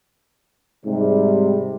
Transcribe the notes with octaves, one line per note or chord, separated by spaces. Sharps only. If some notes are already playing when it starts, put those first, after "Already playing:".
G#2 C3 G3